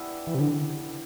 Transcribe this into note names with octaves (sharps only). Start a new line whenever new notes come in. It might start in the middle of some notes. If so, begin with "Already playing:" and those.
Already playing: B3 D4 E4 G4
E3
C3
D3